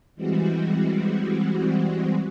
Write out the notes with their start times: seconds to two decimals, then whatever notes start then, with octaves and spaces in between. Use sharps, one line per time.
0.15 E3 G3 G#3 C4 F#4